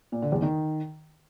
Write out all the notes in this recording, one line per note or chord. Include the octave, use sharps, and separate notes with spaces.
A#2
D3
E2
D#3